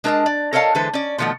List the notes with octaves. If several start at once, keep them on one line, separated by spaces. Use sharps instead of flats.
G#3 D4 A#4 C#5 D#5 A5
D5
A4 A#4 C#5 D#5 F5 A5
D3 E3 G#3 A4 B4 C5
C#4 D5
B2 D#3 F3 A3 F#5